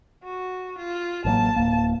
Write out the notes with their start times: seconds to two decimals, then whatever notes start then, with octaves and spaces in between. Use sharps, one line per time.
0.24 F#4
0.78 F4
1.25 A1 F#3 A#3 A5
1.56 D1 A#3